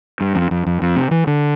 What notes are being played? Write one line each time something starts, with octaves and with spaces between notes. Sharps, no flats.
G2
F2
F2
F2
F2
C3
E3
D3